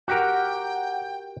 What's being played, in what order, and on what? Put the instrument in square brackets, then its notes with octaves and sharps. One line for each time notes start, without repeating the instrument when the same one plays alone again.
[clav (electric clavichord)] F#4 G4 A#4 [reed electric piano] F#5 [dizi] G5